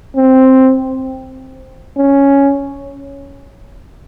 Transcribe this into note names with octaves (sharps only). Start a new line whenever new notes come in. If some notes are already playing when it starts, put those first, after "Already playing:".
C4
C#4